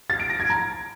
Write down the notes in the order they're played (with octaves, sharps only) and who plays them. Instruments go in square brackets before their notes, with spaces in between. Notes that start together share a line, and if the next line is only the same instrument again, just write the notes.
[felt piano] A6
D7
A#6
G#6
A#5